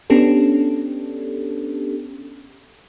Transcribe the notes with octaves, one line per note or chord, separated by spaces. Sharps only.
B3 C#4 D4 G4 A4